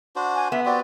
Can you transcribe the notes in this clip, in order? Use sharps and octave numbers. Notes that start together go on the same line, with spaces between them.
D4 F#4 C5
G#5
B3 E5
C4 F#4 G4 D5